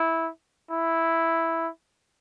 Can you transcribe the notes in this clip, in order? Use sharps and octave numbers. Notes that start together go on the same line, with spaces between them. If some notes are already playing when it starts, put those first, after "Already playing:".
Already playing: E4
E4